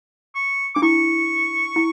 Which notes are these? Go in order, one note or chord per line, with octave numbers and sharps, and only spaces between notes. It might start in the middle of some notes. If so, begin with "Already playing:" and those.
C#6
D4 D6
E4 C#6
E4